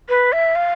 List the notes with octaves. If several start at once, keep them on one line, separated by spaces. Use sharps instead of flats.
B4
E5
F5